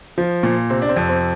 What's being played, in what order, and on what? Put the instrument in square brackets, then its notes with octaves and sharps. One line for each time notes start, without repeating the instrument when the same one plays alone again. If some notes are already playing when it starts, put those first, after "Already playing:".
[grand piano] F3
A#2
C3 C4
D4
C4
F2
C4